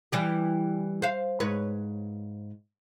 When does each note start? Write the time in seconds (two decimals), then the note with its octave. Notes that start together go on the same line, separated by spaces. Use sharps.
0.12 E3 G3 G4
1.02 C5 F5
1.40 G#2 B4 C#5